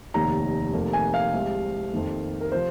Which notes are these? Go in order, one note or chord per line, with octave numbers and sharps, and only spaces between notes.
F1 D#2 D#3 A#5
F1 F2 D#3 A#3
G#5
F5
C2 C3 G#3
F2 D#3 A#3
A#4
C3 F3 C5